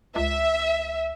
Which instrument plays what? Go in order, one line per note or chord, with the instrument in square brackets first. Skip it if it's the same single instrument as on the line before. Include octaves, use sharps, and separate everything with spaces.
[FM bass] C#2 [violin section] E5